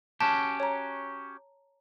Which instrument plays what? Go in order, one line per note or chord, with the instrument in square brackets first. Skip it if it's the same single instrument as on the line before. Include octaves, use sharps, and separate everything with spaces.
[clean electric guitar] C#4 F#4 G4 [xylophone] A5
[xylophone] C#5 A#5